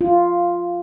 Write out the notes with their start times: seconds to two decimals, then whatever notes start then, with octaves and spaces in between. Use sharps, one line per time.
0.01 F4